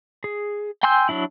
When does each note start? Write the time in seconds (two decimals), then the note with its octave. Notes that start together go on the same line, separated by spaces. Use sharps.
0.24 G#4
0.83 G5 G#5 C6 E6 G6
1.09 F#3 D4 E4